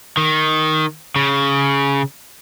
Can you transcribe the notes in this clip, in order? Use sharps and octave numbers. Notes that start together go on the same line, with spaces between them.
D#3
C#3